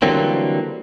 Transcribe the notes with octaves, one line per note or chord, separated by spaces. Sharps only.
D3 E3 F#3 G3 A#3 C4